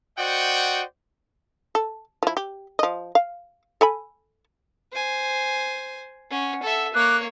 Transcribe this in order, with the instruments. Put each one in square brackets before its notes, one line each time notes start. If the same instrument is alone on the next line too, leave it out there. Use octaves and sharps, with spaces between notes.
[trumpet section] F#4 C5 D5 D#5 F#5 G5
[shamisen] A4
F3 E4
G4
F3 D#5
F5
A4 G#5 B5
[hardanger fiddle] C5 G#5
[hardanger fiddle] C#4 [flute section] F#5
[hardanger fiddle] A4 E5
[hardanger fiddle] A#3 C#5 [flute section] D6 F#6